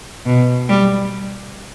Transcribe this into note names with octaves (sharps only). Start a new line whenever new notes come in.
B2
G3